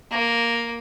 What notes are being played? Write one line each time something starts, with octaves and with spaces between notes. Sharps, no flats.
A#3